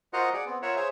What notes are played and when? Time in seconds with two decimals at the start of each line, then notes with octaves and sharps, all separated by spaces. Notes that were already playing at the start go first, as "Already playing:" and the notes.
0.13 F4 F#4 A#4 C5 D#5 F#5
0.33 G#4 D5 F#5
0.46 B3 C4
0.62 F4 A#4 C#5 E5 F#5
0.76 G#4 C5 C#5 E5